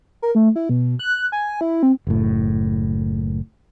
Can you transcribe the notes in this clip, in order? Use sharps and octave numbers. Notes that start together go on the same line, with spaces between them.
A#4
A3
E4
B2
F#6
G#5
E4
C4
F#1 A2